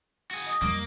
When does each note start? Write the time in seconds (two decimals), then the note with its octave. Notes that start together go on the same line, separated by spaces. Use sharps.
0.31 F#4 G#4
0.48 D#5
0.62 F2 G3 A#3